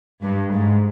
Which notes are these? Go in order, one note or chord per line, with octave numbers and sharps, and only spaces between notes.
G2
G#2